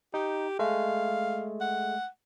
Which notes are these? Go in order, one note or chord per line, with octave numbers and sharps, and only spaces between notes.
D#4 G4
G#3 A3 F5
F#5